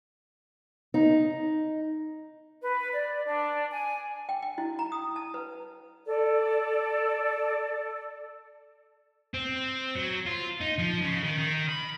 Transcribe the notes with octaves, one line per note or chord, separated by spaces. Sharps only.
D#4
B4
D5
D4
G#5
G5
G5
E4
A#5
D#6
A5
B4
A4 D5
C4
F#3
F4
D#4
F3
C#3
D#3
D#3
B5